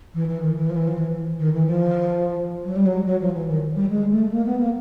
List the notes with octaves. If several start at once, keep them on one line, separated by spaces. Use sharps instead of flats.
E3
E3
D#3
E3
F3
E3
F3
E3
D#3
E3
F3
F#3
G3
F#3
F#3
F3
E3
D#3
G3
G#3
A3
A#3
B3
A#3